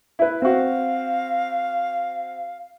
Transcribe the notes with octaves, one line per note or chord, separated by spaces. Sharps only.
E4 B4
C4 F#4 F5